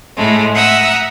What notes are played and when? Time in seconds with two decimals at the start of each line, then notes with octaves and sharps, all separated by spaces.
0.16 A2 G#3 A3
0.54 E5 F#5 A#5 D#6 E6